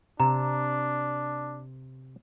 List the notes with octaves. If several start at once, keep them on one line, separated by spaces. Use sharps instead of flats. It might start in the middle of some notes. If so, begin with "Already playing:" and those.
C3 D4 A#5